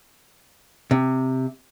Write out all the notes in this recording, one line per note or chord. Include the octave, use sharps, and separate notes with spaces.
C3